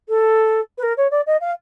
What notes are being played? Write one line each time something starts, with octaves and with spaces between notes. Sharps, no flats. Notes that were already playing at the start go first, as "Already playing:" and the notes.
A4
B4
A#4
C#5
D5
D#5
F5